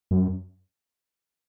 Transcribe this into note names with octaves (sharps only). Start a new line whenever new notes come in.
F#2